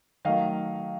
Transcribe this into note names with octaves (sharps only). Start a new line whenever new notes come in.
D#3 F#3 A3 D#5 F5